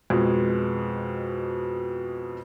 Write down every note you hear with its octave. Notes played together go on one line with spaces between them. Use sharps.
F2 B2 G#3